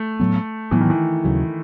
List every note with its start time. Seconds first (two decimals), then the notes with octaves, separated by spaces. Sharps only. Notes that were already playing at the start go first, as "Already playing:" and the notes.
Already playing: A3
0.20 A2 F#3 B3
0.71 A2 E3 F#3 B3
0.81 D#3
0.90 E3
1.25 D#2 C#3 F#3